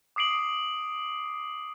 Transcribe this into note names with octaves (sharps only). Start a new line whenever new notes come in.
D6 D#6 C7 D7 F#7